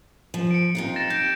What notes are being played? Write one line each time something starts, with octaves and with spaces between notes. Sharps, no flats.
F3
C#7 D7
C3 D#4 F4
A6 A#6 E7
G4 G6 D7